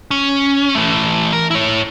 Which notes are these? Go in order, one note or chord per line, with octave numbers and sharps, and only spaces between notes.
C#4
E3 A3
A#4
E4 C#5